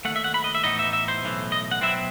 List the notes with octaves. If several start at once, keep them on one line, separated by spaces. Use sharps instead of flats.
D#2 D#3 A3 F#5
E5
F#5
B5
D#5
E5
A2 E3 B3 D#4 D#5
E5
E5
C5
B1 A2 E3
D#5
F#5
B1 B2 F#3 C4 E4 E5